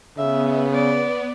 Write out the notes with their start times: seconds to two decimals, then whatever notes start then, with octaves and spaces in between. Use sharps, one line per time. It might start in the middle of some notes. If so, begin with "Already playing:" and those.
0.18 C#3 B3 E5
0.73 D5